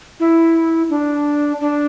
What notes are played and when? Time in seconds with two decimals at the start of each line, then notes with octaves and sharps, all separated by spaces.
0.20 E4
0.90 D4
1.60 D4